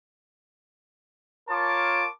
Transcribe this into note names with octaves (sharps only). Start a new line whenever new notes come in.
F4 A#4 C#5 A5 C6 D6